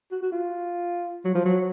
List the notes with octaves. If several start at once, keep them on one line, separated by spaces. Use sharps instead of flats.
F#4
F#4
F4
F#3
F3
F#3